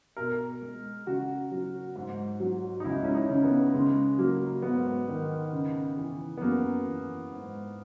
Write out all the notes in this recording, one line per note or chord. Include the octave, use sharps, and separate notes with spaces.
B2 A#4
G#3
C#3 F#4
F#3
G#2
F#3
D#4
C#2 E4
C#4
D#4
C#3
B3
C#3 G#3
F#3 A#3
G#2 B3
D#3
C#3
E3
B3
F#2 A#3
E3
G#2